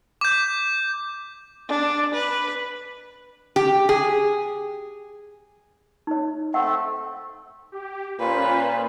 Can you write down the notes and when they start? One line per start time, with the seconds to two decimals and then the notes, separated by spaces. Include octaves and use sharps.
0.21 D6 G6
1.69 D4
2.14 B4
3.56 G4
3.89 G#4
6.07 D#4 C#5
6.54 A3 C4 A4 F#5
7.72 G4
8.19 A#2 C#4 F4 B4 C5